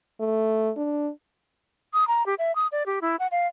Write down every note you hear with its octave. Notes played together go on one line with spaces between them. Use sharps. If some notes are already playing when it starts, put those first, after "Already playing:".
A3
D4
D#6
A#5
G4
E5
D#6
D5
G4
E4
F#5
F5